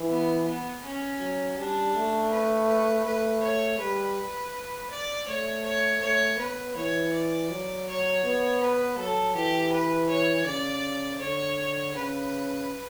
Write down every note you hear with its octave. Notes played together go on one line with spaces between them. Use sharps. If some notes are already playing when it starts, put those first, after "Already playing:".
Already playing: E3
B3
B3
C#4
F#3
G3 D4
A3
B4
B4
A3 B4
C#5
G3 B4
D5
A3 C#5
C#5
A3 C#5
B3 B4
E3 C#5
D5
F#3
C#5
B3
B4
F#3 A4
E3 G4
B4
C#5
C#3 D5
D3 C#5
C#3 B4